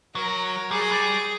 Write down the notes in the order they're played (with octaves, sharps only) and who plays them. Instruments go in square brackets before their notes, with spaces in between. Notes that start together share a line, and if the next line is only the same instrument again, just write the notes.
[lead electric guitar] F#3 [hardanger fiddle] A#4
[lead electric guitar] G3 [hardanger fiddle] G#4
[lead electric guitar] F#3
G3